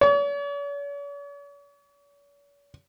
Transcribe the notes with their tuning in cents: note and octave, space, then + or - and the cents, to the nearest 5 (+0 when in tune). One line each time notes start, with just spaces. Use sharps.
C#5 +45